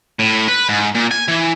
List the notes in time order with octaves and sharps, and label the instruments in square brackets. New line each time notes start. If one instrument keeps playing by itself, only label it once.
[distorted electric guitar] A2
B4
G#2
A#2
G#5
E3